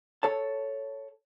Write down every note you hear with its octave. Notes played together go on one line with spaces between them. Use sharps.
A4 C#5 A5